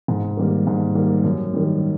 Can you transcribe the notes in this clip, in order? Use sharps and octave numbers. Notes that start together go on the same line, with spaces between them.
G#2
D#3 G3 A#3
G#2
D#3 G3 A#3
F#2
D#3 G3